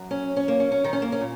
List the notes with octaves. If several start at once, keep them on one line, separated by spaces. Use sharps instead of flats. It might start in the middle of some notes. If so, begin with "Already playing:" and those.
Already playing: F#2 F#3
C#4
C#4
A#3
C#4
C#4
D#3 D#4
C#4
A#3
C#4
A#2